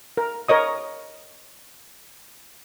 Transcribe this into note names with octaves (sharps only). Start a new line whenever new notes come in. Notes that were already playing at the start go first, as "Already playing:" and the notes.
A#4
A#4 C#5 D#5 D#6